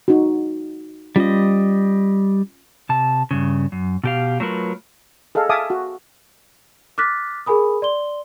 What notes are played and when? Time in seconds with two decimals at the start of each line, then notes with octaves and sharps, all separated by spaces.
0.08 D#4 F#4
1.16 G3 C#4 F4 D#5
2.89 C3 A5
3.31 G2 C#3
3.72 F#2
4.04 B2 G4 F5
4.40 F#3 A3 F4 A#4 B4
5.35 G#4 A4 D#5 F5
5.49 E5 F5 G#5 A5 D6 D#6
5.70 F#4
6.98 D6 F6 F#6 A6 B6
7.46 G#4 A#4 G#5 B5 D#6
7.82 D5 C6 G7